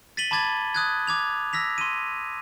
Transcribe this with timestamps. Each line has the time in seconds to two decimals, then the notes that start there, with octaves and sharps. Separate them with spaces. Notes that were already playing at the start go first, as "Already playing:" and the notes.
0.17 A6 B6 D#7 F#7 G7
0.31 A5 B5 D6 G#6 A6
0.75 D#6 F#6 G#6
1.07 D6 G#6 F7
1.53 E6 A#6 B6 F7
1.78 C6 D#7